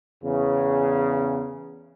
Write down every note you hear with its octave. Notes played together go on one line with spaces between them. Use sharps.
E2 C#3